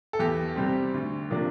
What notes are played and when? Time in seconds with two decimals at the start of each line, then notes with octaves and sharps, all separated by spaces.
0.13 A4
0.19 E2 G4
0.56 C3 G3 C4
0.94 D2
1.31 C3 F3 A#3 D4